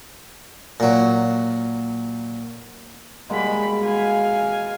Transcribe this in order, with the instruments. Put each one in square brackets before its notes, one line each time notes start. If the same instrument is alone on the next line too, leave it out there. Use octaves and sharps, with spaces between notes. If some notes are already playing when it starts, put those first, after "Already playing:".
[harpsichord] A#2 F#3
[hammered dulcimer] B2 G#3 A#3 [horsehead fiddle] G3 B5
[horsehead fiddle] F5 G#5